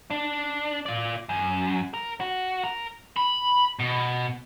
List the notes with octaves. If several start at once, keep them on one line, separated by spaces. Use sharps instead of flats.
D4
F4 D5
F#2
A#4
F#4
A#4
B5
B2